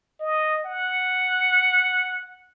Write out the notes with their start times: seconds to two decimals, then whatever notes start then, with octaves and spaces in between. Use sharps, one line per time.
0.20 D#5
0.66 F#5